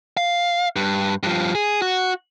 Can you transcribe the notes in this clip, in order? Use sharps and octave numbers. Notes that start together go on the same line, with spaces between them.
F5
G2
G2 F3
G#4
F#4